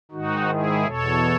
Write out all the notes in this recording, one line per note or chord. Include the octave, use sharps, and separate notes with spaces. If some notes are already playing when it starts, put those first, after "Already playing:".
G#2 D#3 D#4 F#4
E4 G#4
E2 B2 A4 C#5